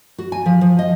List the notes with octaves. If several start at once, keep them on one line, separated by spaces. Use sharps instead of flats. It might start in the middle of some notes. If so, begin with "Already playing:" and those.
F#4
G#5
F3
F3
D#5